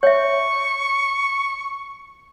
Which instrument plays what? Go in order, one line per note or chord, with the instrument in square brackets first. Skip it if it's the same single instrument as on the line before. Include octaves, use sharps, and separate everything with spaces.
[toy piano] C#5 E5 [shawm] C#6